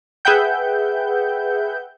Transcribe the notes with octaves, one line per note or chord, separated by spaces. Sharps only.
G#4 B4 E5 F#5 G5 G6